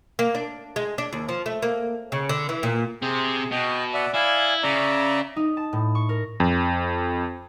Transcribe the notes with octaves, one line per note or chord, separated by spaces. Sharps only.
A#3
D4
G#3
D4
D#2
F3
A3
A#3
C#3
D3
E3
A#2
C3 C4 G#4
B2 D#5 G5
D5 E5 F#5
E4 D5 F5 G#5
C#3 D5 E5 A#5
D#4
A5
A2
C#6
A#4
F2